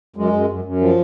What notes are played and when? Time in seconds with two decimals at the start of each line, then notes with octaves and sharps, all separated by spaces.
0.16 F#2 G#3
0.33 F#2
0.49 F#2
0.64 F#2
0.81 F3